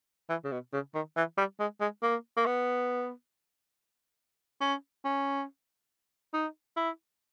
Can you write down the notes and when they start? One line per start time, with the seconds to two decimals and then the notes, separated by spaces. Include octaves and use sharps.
0.29 E3
0.44 C#3
0.52 B2
0.73 C#3
0.94 D#3
1.16 E3
1.37 G3
1.60 G#3
1.81 G#3
2.03 A#3
2.37 A#3
2.46 B3
4.61 C#4
5.04 C#4
6.34 D#4
6.76 E4